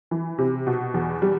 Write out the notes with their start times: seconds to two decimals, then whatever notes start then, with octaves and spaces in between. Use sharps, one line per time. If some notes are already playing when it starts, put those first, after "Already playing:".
0.11 E3
0.38 C3
0.67 B2
0.94 E2
1.22 G3